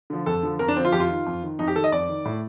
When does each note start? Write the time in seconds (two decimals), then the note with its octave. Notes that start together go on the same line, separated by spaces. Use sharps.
0.10 D3 F3
0.26 F2 A4
0.43 D3 F3
0.59 F2 A#4
0.68 D4
0.76 D3 F3 C4
0.85 F4
0.92 F2 G4
1.00 F4
1.09 D#3
1.26 F2
1.43 D#3
1.59 F2 D#4
1.68 G4
1.76 D#3 A4
1.84 D#5
1.92 F2 D5
2.09 D#3
2.25 A2